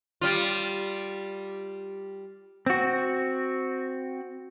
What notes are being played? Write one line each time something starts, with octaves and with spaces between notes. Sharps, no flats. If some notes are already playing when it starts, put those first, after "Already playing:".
G3 F4
C4 F#4